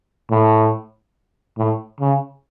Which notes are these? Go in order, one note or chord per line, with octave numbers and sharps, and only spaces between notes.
A2
A2
C#3